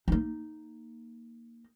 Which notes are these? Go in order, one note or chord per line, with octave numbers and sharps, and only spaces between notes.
A#3 D#4